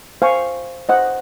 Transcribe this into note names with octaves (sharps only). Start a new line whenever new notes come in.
C5 F5 G#5 C#6
C5 D#5 F#5